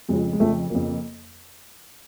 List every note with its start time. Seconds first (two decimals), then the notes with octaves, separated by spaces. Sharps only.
0.09 F2 C#3 F3 G#3
0.33 G#3
0.40 F2 C#3 F3 A3
0.70 F2 C#3 F3 A#3